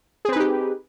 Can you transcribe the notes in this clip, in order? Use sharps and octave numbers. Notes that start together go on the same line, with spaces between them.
C4 D#4 G4 G#4 B4